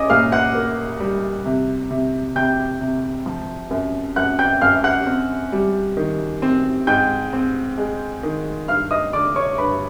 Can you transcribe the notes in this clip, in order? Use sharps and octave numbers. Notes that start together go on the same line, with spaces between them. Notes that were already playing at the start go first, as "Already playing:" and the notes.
Already playing: C#4 D#5 D6 D#6
A#2 F5 F6
F#5 F#6
A#3
G3
C3
C3
C3 G5 G6
C3
F3
F#2
F#2 F#5 F#6
G5 G6
F#2 F5 F6
F#5 F#6
C4
G3
D#3
C4
G#2 G5 G6
C4
G#3
D#3
G2 F5 F6
D#5 D#6
D3 D5 D6
C#5 C#6
G2 B4 B5